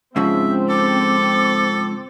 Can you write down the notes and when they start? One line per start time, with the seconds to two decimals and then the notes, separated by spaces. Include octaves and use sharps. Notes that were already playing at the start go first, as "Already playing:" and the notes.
0.16 G#2 C#3 F3 C4 E5
0.69 A4 D6